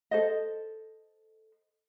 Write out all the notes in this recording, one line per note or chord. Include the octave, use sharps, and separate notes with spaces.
A4 C5 D#5